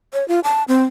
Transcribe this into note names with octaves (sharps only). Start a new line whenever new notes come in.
C#5
F4
A5
C4